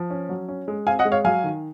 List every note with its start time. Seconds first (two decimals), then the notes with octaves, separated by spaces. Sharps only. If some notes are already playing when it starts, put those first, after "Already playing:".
Already playing: F3
0.10 C#4
0.29 F#3
0.48 C#4
0.68 G#3
0.87 C4 F5 G#5
0.99 D#5 F#5
1.05 G#3
1.12 C#5 F5
1.24 F#3 F5 G#5
1.44 D#3